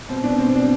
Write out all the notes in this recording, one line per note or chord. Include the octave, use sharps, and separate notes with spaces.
B2 C4
B2 D4
B2 C4
B2 D4